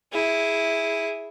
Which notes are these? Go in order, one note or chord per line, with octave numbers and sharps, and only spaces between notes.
E4 G#4